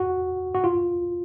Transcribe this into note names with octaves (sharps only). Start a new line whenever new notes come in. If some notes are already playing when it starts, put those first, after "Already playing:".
Already playing: F#4
F#4
F4